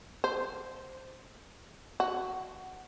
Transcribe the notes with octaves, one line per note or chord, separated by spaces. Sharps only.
C5
F#4